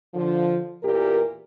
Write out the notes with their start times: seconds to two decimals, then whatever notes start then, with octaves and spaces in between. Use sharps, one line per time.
0.14 D3 F3
0.83 E2 A#2 E3 G4 A#4